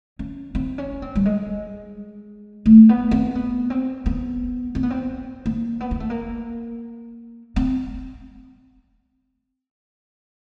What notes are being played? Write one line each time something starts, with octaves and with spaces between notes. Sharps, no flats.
C#4
C4
C#4
C4
G3
G#3
A3
B3
C4
B3
C4
B3
C4
B3
C4
A#3
B3
A#3
A3
A#3
C4